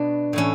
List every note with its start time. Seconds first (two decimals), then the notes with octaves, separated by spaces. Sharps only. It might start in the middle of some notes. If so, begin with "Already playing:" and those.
Already playing: B2 D4
0.33 A2 E3 C#4